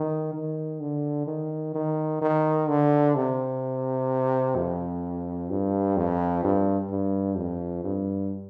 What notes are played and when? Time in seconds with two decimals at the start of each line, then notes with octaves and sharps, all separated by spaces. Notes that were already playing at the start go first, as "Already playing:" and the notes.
Already playing: D#3
0.33 D#3
0.80 D3
1.27 D#3
1.75 D#3
2.21 D#3
2.69 D3
3.15 C3
4.56 F2
5.50 G2
5.97 F2
6.44 G2
6.90 G2
7.37 F2
7.84 G2